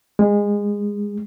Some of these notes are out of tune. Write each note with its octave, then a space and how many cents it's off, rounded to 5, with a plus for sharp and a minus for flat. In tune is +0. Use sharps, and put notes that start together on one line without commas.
G#3 -20